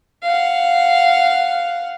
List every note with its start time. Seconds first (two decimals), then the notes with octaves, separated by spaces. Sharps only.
0.23 F5 F#5